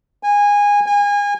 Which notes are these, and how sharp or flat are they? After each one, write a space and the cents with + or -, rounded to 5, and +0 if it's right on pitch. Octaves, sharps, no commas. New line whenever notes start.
G#5 -20
G#5 -30